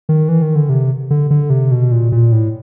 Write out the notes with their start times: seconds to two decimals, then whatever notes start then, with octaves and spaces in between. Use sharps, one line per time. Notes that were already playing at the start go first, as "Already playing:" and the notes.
0.09 D#3
0.29 E3
0.42 D#3
0.55 D3
0.69 C3
1.10 D3
1.30 D3
1.50 C3
1.71 B2
1.92 A#2
2.12 A#2
2.32 A2